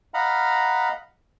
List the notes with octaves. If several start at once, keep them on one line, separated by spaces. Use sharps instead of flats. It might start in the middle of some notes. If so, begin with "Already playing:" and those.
D#5 F5 F#5 A#5 B5 F6